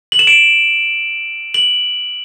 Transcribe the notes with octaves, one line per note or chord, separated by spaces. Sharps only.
F#7
E7
D7
F#7